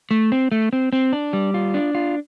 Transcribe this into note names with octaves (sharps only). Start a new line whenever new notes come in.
A3
C4
A3
C4
C4
D4
G3
F4
D4
F4